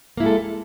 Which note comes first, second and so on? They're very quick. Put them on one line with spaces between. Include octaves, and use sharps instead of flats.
A#3 E4 G#3 A4